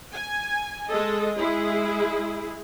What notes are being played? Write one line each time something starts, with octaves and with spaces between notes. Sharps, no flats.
G#5
G#3 A4 D#5
G#3 E4 G#4